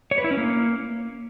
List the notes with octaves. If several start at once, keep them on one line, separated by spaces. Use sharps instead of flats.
C#5
B4
E4
C#4
A#3